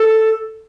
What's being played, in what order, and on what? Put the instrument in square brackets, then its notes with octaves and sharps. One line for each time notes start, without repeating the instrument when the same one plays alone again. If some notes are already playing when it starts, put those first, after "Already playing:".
Already playing: [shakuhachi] A4